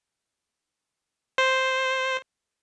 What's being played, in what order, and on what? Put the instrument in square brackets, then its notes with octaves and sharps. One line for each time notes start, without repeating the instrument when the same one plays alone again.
[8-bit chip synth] C5